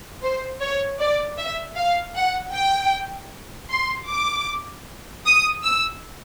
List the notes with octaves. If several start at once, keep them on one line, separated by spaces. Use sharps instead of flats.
C5
C#5
D5
E5
F5
F#5
G5
C6
D6
D#6
E6